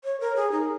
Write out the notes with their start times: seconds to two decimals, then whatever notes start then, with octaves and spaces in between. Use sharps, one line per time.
0.04 C#5
0.20 A#4
0.36 G#4
0.52 D#4